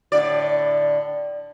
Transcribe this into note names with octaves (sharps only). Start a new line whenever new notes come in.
A2 D3 D5